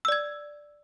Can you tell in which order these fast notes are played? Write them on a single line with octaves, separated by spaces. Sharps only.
E6 D5 G#6